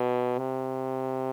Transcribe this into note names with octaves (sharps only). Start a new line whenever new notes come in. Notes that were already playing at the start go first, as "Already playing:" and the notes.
Already playing: B2
C3